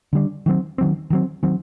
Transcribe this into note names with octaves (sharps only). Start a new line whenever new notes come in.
D3 G3 D4
D#3 F#3 C4
D#3 F#3 C4
D#3 F#3 C4
D#3 F#3 C4